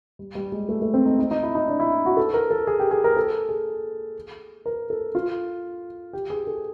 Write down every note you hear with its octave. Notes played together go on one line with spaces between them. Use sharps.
G3
G3
G#3
A3
A3
C4
D#4
D#4
D#4
E4
D#4
D4
E4
F#4
A4
A#4
A4
G#4
G4
G#4
A#4
A4
G#4
A#4
A4
F4
G4
G#4
A4